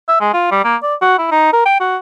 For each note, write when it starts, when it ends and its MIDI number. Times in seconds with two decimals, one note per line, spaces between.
0.08 0.19 76
0.20 0.31 56
0.33 0.48 65
0.51 0.63 55
0.64 0.76 58
0.83 0.94 74
1.01 1.18 66
1.18 1.31 64
1.31 1.50 63
1.52 1.61 70
1.66 1.76 79
1.80 1.97 66